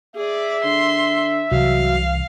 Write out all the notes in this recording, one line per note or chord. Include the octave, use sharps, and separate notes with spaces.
G#4 D5 E5
D3 C6
C2 C3 E3 F#3 F5